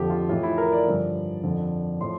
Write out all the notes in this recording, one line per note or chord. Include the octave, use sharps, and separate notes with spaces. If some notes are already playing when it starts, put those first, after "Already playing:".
Already playing: F2 D3 F3 G4 A4
F4
A2 E3 F4
E4
A#4
D5
G2 D3 F3
F2 D3 F3
A2 F3 C6